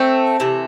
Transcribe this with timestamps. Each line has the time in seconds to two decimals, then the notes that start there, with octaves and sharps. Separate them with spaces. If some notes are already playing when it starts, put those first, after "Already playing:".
Already playing: A3 C4
0.40 C3 E3 A3